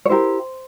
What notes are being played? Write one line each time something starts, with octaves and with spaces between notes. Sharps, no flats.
C#5
E4 G4 A#4 C5